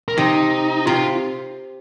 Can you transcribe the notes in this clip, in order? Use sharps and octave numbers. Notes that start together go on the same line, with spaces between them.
A#4
C3 D#4
C3 F4